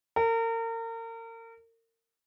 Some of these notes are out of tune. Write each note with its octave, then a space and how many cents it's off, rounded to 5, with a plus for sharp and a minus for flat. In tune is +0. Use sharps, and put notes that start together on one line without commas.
A#4 -35